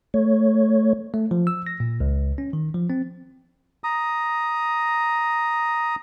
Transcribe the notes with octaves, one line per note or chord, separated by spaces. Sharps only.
A3 C#5
A3
F3
E6
A#6
A#2
C#2
C#4
D#3
F3
C4
A#5 D#6